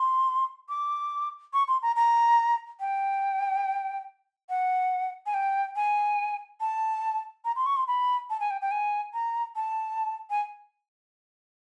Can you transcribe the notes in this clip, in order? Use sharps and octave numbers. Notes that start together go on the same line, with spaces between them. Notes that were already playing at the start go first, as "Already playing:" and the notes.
Already playing: C6
D6
C#6
C6
A#5
A#5
G5
F#5
G#5
G5
G#5
A5
A#5
C6
C#6
C6
B5
A5
G#5
G5
G5
G#5
A#5
A5
G#5